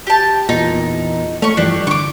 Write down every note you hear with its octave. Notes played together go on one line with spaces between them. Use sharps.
G4 A5
E2 A#2 D#4
A3 C#4 C#6
G2 E3 F3 D4 G4
D3 C#6 D6